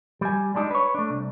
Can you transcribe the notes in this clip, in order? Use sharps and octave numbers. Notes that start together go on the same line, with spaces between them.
G3 G#5
G3 G#3 D4 D#4
B4 C#5
A3 D4
C2